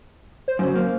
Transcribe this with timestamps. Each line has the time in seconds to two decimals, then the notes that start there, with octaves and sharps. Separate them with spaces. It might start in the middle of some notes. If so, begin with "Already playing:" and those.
0.48 C5
0.59 F#2 C#3
0.75 A#3